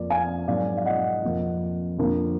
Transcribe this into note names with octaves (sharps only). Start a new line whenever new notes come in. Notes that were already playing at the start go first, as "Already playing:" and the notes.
Already playing: F2 F3 A#3 D5
F5 G#5
G#2 F#3 A#3 D5 F5
F5
D#5 F#5
F2 F3 A#3
F2 D3 F3 A#3